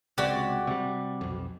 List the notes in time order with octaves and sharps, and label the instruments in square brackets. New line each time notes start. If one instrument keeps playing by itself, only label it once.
[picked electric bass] C#2 C3 G#3 [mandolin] F#4 G4 D5
[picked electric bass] C3 G3
B1 F2